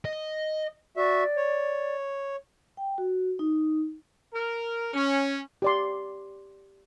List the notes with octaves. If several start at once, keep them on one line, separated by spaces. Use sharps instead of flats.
D#5
F#4 D5 E5
C#5
G5
F#4
D#4
A#4
C#4
G4 D5 C6